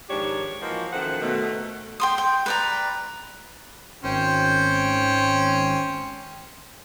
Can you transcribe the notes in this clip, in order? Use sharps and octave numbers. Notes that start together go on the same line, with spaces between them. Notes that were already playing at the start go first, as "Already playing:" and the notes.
G#2 D#3 F3 D4 G4 C#5
E3 F3 A#3 F#4 D#5
F#2 D#3 F3 A3 C5 F#5
B2 D#3 A3
G5 C6 D#6
G5
B4 D5 A#5
G#1 C#4 C5 G5